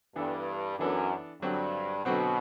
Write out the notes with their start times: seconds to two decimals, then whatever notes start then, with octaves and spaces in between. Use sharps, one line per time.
0.16 G2 E3 B3 D4 A4
0.78 F#2 E3 B3 D4 A4
1.42 G2 D3 F#3 C4 F#4
2.05 B2 D3 F#3 C4 F#4